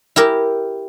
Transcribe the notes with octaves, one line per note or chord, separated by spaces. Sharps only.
E4 G4 A#4